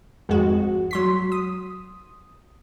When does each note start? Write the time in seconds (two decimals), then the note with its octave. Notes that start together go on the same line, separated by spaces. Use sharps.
0.29 G#1 F2 G#2 G#3 F#4
0.91 F#3 C6 B6
1.32 D#6